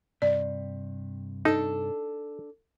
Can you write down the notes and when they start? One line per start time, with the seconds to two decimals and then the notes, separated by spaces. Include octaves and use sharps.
0.22 G2 C3 D5
1.45 D4 D#4 A4